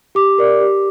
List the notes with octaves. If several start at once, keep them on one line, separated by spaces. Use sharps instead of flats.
G4 D6
A#4 D5
G4